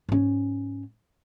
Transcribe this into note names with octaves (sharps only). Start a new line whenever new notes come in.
G#2 C#4